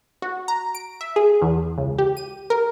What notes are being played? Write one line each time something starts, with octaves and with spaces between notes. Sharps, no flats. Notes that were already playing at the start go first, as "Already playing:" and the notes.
F#4
A#5
D7
E5
G#4
E2
C#2
G4
D#7
A#4